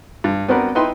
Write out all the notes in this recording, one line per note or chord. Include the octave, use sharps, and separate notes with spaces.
G2
B3 C4 D4 F#4 A#4 B4
D#4 E4 B4 G5 C6